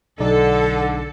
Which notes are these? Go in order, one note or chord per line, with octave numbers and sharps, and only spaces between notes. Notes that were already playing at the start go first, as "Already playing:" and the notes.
B1 D3 D#4 A4 D5